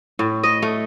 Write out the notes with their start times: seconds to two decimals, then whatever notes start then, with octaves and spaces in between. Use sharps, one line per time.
0.19 A2
0.43 D#5
0.62 A3